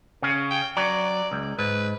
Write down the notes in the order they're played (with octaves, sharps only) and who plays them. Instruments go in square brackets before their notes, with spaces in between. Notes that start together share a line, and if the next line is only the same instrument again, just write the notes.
[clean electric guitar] C#3 C#4
[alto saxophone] G5
[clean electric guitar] F#3 [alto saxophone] D5
[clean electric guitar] C#2
[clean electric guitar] G#2 [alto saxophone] B4